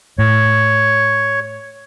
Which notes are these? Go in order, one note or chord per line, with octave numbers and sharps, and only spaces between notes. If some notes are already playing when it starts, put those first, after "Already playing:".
A2 C#5